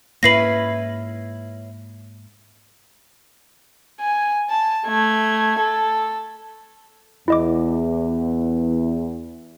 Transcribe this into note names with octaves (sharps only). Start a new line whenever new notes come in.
G#2 A#3 C#4 E4 B4 A#6 C7 F#7
G#5
A5
A3 G#6
A4
E2 E4 D#5 D6